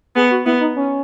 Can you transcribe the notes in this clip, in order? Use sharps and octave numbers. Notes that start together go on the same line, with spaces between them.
B3 G#4
F#4
B3 E4
D#4
C#4